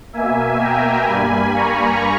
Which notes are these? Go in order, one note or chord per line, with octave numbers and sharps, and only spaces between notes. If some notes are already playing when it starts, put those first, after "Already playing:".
B2 A#3 E5 G#5
G5 A#5
G2 G3 A#3 G#5 B5
A#5 C#6